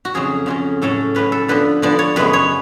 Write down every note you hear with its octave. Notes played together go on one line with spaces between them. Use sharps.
F#4
F2 C#3 F#3 C#4 G#4
F2 C#3 F#3 C#4
A2 F#3 C#4 A4
A2 F#3 C#4 B4
A4
D3 F3 B3 D4 B4
D3 F3 B3 D4 D5
C#5
F#2 C#3 G#3 B3 B4
C#5